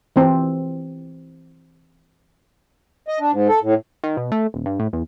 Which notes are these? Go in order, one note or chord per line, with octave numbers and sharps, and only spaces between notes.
E3 C4
D#5
D4
G#2
A4
A2
D#3
B2
A3
D#1
G2
A2
E2